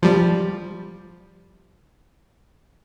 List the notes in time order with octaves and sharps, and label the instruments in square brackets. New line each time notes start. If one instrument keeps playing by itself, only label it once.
[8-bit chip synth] F3 G3